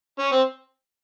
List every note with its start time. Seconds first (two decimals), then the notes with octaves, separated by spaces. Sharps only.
0.19 C#4
0.32 C4